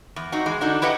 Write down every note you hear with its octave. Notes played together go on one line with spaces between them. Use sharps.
E2
C4 D#4 F#4
E3 G#3
D3 D4 D#4 F#4
E4 G4 B4 D#5 F#5